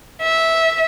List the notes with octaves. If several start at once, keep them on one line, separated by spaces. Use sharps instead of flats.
E5